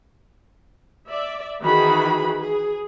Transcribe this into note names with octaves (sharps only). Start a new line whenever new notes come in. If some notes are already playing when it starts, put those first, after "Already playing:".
D5 E5
D#3 E3 F#4 G#4 B5
G#4